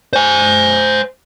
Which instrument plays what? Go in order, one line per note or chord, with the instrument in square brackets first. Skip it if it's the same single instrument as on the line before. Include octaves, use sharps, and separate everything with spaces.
[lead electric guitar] C5 G#5